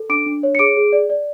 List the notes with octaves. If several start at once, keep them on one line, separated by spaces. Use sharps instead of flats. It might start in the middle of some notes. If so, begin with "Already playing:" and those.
Already playing: A4
D4 D6 D7
D4
C#5
C#7
G#4 D6 D7
G#4
D5
D5